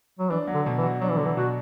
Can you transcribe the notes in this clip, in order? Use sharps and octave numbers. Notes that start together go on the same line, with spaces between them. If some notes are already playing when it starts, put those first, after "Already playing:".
F#3
E3 D4
F#3
D3
B2
E3
F#4
F#3 D4
E3
D3 F#3
E3
B2 F#4